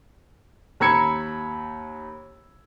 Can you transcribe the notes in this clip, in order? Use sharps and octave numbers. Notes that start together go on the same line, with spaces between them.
D#2 A#5 B5 E6 G#6 C#7